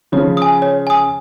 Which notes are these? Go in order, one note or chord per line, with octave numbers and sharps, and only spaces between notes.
C#3 F3 C#5
G#5 D#6
C#5
G#5 D#6